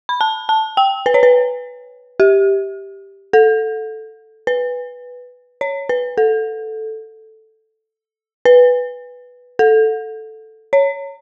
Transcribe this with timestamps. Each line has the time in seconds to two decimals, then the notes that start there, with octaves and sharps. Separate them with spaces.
0.09 B5
0.21 A5
0.49 A5
0.77 G5
1.06 B4
1.14 C#5
1.23 B4
2.20 G4
3.33 A4
4.47 B4
5.61 C#5
5.89 B4
6.18 A4
8.45 B4
9.59 A4
10.73 C#5